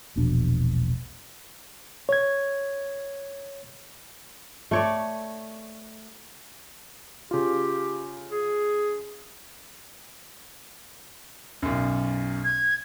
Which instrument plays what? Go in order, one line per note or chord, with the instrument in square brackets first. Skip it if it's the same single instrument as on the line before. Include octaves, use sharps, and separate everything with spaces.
[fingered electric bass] E1 A#1 B2 D4
[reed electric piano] C#5 G#6
[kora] A3 C#5 D5
[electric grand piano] C#3 F4 [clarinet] G4
[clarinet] G#4
[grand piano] B1 F#2
[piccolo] G#6